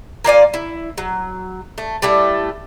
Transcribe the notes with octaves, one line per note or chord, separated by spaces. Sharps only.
A#3 F4 D5 G#5
E4
F#3
A3
G3 A3 E4